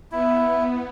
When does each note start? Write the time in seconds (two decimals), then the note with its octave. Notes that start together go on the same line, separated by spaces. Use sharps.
0.12 B3 E4